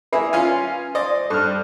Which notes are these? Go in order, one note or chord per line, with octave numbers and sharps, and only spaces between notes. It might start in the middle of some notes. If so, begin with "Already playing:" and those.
A#3 E4 G#4 B4
C#4 F4 G#5
C5 D5 D#5
G2 A4 F6